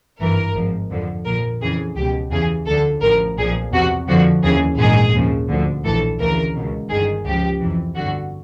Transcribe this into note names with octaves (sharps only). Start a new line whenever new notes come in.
G#1 G2 E3 A#4
G#1 G#2 F3
F2 D3 F3
A#1 A#2 F3 A#4
F2 C#3 E3 G#4
C#2 B2 G4
E2 C#3 E3 G#4
D2 D3 F3 A4
A1 A2 F3 A#4
B1 A#2 F3 G#4
E2 C3 F3 F#4
F2 D3 F3 F#4
D#2 C#3 E3 G#4
A#1 G#2 D#3 G#4
D#2 C#3 F3
D2 D3 F3
A#1 A2 E3 A4
D2 C#3 E3 A#4
C#2 B2
G1 G2 D#3 G#4
C#2 C#3 F3 G4
F2 C3 E3
G1 G2 D3 F#4